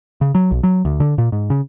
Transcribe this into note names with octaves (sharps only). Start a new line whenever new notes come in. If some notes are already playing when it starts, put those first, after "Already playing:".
C#3
F#3
B1
F#3
D2
D3
A#2
G#2
C#3